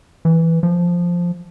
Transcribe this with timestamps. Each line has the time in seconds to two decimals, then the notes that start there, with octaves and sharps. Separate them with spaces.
0.25 E3
0.63 F3